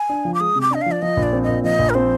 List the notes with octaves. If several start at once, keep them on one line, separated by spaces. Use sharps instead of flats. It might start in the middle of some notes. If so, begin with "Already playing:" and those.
Already playing: G#5
D4
F3
D6
G#3 D#6
C3
D6
D4 D#5
F3 F5
D5
F3 D#5
A#1
D5
C4
D#5
A#2
F3 D#5
A#1
A#4
C4 C5